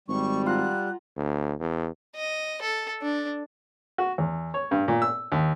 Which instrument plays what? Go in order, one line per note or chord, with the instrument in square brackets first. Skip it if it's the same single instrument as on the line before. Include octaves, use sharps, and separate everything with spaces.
[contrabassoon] G#1 [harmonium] G3 [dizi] C#6
[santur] F4 F#5 A#5 [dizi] F#6
[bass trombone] D2
E2
[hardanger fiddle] D#5
A4
D4
[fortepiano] F#4
E2
C#5
G2
A#2
E6
D#2